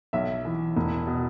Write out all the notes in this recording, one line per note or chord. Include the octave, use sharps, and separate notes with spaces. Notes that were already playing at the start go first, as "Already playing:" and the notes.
B1 E5
E3
E1
B2